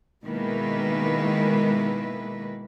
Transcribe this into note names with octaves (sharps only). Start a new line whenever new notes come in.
B2 D#3 G#3 A#3 E4 B4